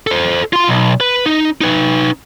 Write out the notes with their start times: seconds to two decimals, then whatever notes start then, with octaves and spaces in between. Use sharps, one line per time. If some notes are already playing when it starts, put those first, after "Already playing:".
0.07 A4 C5
0.53 F4 C6
0.67 B1
1.00 B4
1.26 D#4
1.61 D#4 B4